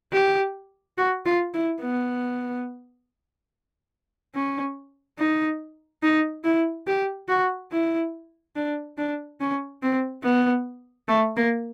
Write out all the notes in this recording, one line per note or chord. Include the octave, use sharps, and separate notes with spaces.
G4
F#4
F4
E4
B3
C#4
D#4
D#4
E4
G4
F#4
E4
D4
D4
C#4
C4
B3
A3
A#3